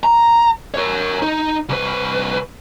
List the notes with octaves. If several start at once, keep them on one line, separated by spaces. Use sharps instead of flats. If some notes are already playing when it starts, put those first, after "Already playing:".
A#5
A#4 C#5
D#4
C2 B4